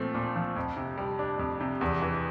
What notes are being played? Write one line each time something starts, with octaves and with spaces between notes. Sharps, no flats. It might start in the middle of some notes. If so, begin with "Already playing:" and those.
Already playing: A#2 F3 A3 C4
A#2
F3
F2
C3
G3
D4
F2
C3
E2
E3